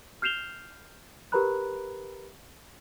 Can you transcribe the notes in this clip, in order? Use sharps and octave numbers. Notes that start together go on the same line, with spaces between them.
F6 G6 C7 E7 F7 G7
G4 A#4 B4 A#5 B5 F#6